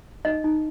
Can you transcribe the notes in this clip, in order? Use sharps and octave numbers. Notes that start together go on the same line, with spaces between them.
D#4 D#5
D#4